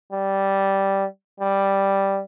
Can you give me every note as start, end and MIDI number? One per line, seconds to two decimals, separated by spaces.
0.12 1.05 55
1.40 2.20 55